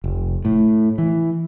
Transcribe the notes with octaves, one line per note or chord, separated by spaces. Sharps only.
F1
A2
E3